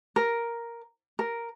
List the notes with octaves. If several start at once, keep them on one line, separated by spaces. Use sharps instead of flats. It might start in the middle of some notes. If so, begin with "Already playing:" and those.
A#4
A#4